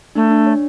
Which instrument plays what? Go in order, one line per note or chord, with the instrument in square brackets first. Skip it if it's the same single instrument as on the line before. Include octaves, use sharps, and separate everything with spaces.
[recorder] A3 [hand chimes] D4
[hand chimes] D4
C#5